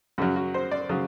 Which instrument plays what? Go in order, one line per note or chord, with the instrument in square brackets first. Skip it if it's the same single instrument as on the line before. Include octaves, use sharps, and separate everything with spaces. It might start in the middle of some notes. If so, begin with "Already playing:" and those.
[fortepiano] F#2 C#3 F#3 F#4
F#4
C5
D5
C#3 F#3